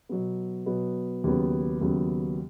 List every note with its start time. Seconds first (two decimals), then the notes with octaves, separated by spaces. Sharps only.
0.09 B2 F#3 B3
0.66 B2 F#3 B3
1.24 D#2 C#3 F#3 B3
1.81 D#2 C#3 F#3 B3